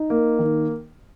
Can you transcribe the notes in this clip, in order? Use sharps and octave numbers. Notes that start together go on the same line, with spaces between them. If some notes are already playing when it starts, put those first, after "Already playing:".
Already playing: D#4
A#3
D#3